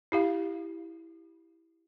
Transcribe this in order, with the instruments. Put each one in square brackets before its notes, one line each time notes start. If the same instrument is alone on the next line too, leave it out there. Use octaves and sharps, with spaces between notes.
[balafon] E4 G4 F5